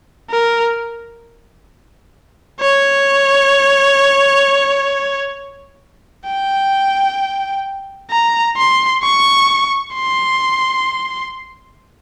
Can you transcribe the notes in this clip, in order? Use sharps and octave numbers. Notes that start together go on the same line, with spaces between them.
A#4
C#5
G5
A#5
C6
C#6
C6